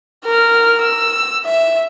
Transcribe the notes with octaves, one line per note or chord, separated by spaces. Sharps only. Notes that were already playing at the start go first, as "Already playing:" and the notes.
A#4 F6
E6
E5